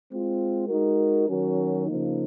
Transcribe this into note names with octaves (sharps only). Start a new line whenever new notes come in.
G#3 C4 F4
G#3 D#4 F#4 A#4
D#3 F#3 C#4 F#4 A#4
C#3 F3 A#3 D#4